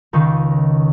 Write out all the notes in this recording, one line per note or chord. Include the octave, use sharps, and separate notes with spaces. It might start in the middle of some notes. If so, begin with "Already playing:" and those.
C#2 D#3 D#4